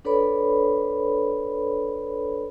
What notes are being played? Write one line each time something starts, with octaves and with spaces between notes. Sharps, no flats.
D4 A4 B4 C#5 D5 B5